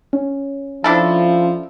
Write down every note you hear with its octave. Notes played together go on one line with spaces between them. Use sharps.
C#4
F3 D4 E4 A4